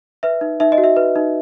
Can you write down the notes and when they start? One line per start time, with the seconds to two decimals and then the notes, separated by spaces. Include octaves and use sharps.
0.23 B4 E5
0.41 D#4
0.60 D#4 E5
0.72 D#5
0.78 F#4
0.84 E5
0.96 B4
1.16 D#4